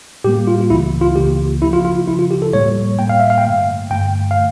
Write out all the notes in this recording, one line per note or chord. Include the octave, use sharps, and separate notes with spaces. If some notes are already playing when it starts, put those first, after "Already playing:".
A2 G3 A#3 G4
F4
F4
C#2 C#3 E3 A#3 E4
F4
C#2 C#3 E3 A#3 G4
D2 C#3 F3 E4
F4
F4
D2 C#3 F3 E4
F4
G4
A4
A2 G3 A#3 C#5
A2 G3 A#3 G5
F5
E5
F5
G5
G2 D3 A3 F5
G2 D3 A3 G5
F5